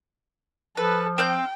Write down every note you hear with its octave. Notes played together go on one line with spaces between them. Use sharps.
F3 A4 B4
C4 F5 G5 G6